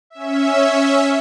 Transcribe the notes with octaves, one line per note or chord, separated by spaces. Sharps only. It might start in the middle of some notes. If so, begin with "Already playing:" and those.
C#4 E5